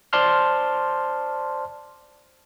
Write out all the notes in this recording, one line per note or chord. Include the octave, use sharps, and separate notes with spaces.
C5 D5 A5 C6 F6